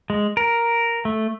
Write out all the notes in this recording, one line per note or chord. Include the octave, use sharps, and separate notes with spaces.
G#3
A#4
A3